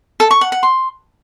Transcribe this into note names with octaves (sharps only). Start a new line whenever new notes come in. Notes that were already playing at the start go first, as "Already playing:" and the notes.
A4
C#6
F#5
F#5
C6